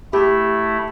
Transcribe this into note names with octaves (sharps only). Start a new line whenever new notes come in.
A3 E4 G4